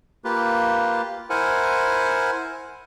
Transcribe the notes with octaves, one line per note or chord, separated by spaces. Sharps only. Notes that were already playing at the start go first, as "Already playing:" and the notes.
A#3 F4 G4 B4
E4 A#4 C5 F#5 G#5